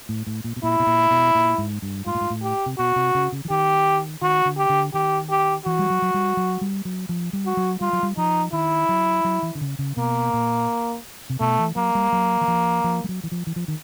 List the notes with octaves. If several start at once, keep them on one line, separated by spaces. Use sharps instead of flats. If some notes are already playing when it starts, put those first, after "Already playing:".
A2
A2
A#2
B2
A#2 E4
B2
A#2
B2
A#2
G#2
G2
G#2 F4
A2
G#2
A2
G4
C3
B2 F#4
C3
C#3
C#3
E3
D#3 G4
D#3 F#4
D3
G4
D3
D#3 G4
G4
E3 F#4
G3
F#3
F#3
G3
F#3
G3
F#3
F3
G3
F#4
F#3
G3 F4
F#3
G3
F3 D#4
D#3 E4
F#3
F#3
E3
D3
C#3
C#3
B2 A#3
A#2
C3
B2 A3
E3
F#3 A#3
G3
F#3
E3
F3
F3
G3
F#3
E3
F3
E3
F3
D#3